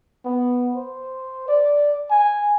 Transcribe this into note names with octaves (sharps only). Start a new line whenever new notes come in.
B3
C5
D5
G#5